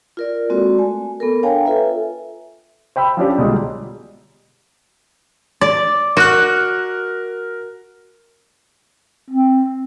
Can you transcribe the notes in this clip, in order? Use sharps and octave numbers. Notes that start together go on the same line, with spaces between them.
F4 A#4 D5
G#3 A#3 C4 F#4 A4 D5
A3 G#5
B3 A4 A#4
D4 C#5 F5 G5 G#5 A#5
F4 A4 B4 E5
C5 G5 B5 E6
F3 C#4 D4 G4
B1 D3 G3 G#3
D5
F#4 A#4 F#6
C4